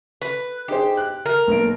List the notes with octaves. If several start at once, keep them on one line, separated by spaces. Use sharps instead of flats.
B4
D#4 G4 G#4 C5
F#6
A#4
B1 A#3 D7